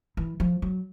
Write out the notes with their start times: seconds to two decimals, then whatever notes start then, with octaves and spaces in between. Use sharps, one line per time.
0.17 E3
0.40 F3
0.62 F#3